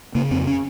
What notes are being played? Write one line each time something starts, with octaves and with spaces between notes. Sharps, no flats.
C#3 A#3
F2 C4
C#4